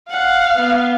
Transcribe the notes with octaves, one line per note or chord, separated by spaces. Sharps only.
F5 F#5
B3